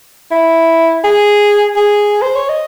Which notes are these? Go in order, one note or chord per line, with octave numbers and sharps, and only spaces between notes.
E4
G#4
G#4
C5
C#5
D#5